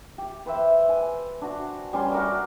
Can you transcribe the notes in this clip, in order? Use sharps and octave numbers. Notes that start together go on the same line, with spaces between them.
G4
B4 C5 E5 G5
G#5
D4 F#4
G3 C#4 A5 C6
F#4 A#4 D5